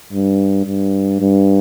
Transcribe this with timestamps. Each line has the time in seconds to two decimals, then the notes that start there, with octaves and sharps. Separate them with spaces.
0.13 G2
0.66 G2
1.20 G2